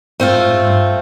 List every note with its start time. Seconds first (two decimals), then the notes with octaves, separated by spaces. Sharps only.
0.20 G#2 A3 C4 F4
0.35 G#2
0.49 G#2
0.65 G2